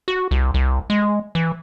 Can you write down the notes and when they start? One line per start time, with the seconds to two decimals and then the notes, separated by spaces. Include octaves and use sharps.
0.08 F#4
0.31 C2
0.54 C2
0.90 G#3
1.35 E3